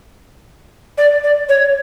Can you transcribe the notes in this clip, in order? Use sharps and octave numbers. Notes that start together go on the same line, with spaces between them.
D5
D5
C#5